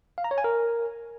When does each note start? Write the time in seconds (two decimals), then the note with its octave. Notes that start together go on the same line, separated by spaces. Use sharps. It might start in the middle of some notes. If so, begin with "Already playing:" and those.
0.18 F5
0.24 A#5
0.31 C#5
0.38 G#5
0.44 A#4